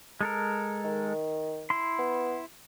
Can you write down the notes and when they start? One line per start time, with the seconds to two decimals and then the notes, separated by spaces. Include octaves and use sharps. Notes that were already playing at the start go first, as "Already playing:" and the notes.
0.21 G#3 A4 A#4
0.84 D#3
1.70 E4 C6
1.99 B3